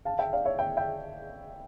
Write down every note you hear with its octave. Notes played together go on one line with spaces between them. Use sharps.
F5 A5
E5 G5
D5 F5
C#5 E5
E5 G5
E5 G5